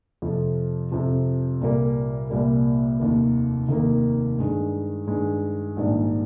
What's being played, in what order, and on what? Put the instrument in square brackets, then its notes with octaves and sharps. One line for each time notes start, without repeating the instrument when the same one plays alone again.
[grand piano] F2 C3 F3
F2 C3 F3
C2 A#2 G3 A#3
C2 A#2 G3 A#3
F1 D#2 D#3 A#3
F1 D#2 D#3 A#3
G2 D#3 G#3
G2 D#3 G#3
A#1 G#2 D#3 G3 D4